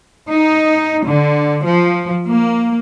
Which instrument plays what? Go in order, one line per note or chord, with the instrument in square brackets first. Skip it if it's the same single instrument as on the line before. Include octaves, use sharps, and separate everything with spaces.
[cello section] D#4
D3
F3
A#3